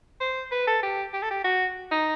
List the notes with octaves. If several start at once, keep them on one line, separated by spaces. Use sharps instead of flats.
C5
B4
A4
G4
G4
A4
G4
F#4
D#4